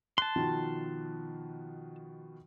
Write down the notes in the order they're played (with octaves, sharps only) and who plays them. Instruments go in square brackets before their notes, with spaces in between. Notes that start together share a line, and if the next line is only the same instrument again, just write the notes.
[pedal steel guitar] A5 C6 [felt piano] F#6
[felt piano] B2 D#3 F3